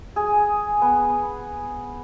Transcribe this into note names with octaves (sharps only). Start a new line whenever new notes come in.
G#4
B3